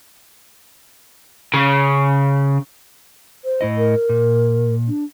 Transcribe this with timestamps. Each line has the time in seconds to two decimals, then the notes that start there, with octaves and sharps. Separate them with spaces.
1.54 C#3
3.45 C5
3.61 A2 E4 D#5
3.78 A#4
4.09 A#2
4.88 D4